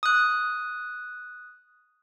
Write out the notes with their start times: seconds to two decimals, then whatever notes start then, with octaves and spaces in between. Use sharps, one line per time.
0.03 D#6 F#6